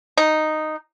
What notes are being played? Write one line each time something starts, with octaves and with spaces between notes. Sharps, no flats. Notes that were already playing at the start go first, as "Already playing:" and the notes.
D#4